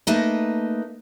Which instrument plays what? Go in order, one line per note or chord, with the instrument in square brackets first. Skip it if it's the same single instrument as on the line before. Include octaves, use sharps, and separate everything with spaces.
[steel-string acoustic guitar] A3 A#3 D#4 B4 D#5 A5